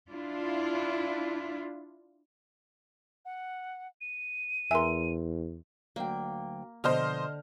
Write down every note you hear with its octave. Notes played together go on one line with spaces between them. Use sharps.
D4 E4 F4
F#5
D#7
E2 A#4 E5 G#5 C6
D2 F#3 A#3 G5
B2 D3 F3 C5 D#5 F6